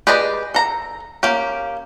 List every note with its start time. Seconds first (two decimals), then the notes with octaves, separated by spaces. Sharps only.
0.07 G4 G#4 B4 D5 D#5
0.54 A4 A#5
1.23 A#3 C#4 G4